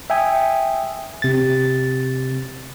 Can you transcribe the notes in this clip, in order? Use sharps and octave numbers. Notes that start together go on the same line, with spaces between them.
E5 G5 G#5 D#6
C3 A6